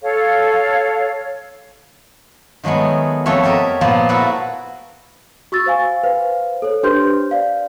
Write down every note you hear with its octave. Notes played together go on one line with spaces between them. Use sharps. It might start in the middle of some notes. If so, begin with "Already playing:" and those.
A4 C#5 F5
D#3 F#3 G#3 A3 B3
F2 A3 F#4 C#5 E5
G4 A4 A#4 D#5 E5
A#2 F3 B3 A5
A#3 E4 F#4 A4 B4
F#4 C#6 E6 A6
C5 F5 G#5
B4 C5 F5
A4 C#5
D4 G4 B4 C5 C6 G6
D5 F5